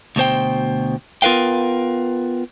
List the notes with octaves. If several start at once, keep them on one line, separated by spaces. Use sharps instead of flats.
D2 B2 C5 G5
B3 F4 A#4 B4 F5 G5